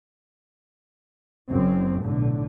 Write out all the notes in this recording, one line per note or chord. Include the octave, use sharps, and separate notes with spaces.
F#1 F#2 C4
B1 A2 D3